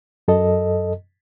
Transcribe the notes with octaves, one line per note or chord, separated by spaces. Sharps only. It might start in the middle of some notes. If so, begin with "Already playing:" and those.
F#2 A4 D#5